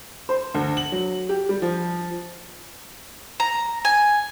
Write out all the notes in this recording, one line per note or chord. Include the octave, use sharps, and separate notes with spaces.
C5
D2
F#7
F#3
G4
G3
F3
A#5
G#5